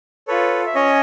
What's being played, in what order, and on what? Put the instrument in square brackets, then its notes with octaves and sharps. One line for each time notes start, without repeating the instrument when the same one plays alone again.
[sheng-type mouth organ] F4 A4 B4 C#5
E5
C#4 C#5 D#5